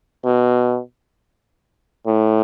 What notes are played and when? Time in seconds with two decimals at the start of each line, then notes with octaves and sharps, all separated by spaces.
0.25 B2
2.07 A2